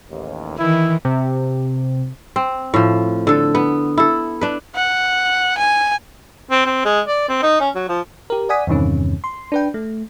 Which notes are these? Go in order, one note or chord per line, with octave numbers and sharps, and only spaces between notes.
A1 D#2
D#3 E3 E4
C3
C4
A2 F3
D3 A4
B3
E4 A4
D4 B4
F#5
G#5
C4
C4
G#3
D5
C4
D#4
C#4
F#3
F3
G4 A#4
D5 F#5 G#5 D#6 B6
E2 G2 C3 D#3 C#4
C6
D4 B4 G5
A3